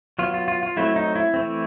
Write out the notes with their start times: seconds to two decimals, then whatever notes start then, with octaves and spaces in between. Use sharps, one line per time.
0.19 F#3 B3 F4
0.34 F4
0.48 F4
0.63 F4
0.77 F#3 A3 C4 E4
0.96 D#4
1.15 E4
1.34 E3 A3 C4